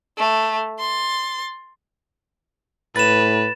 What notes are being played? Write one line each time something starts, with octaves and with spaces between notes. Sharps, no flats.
A3
C6 A6
A2 B4 A6 E7